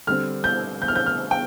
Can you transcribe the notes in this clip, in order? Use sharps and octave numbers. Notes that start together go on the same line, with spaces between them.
D3 G3 C4 F6
G6
G6
F6
G6
F6
G5